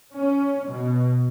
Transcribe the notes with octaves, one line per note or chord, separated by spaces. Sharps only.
C#4
B2